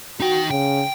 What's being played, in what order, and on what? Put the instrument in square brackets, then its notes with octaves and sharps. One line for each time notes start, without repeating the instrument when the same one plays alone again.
[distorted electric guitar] D#4 G5 [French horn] F#4
[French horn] C#3 [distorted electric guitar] G5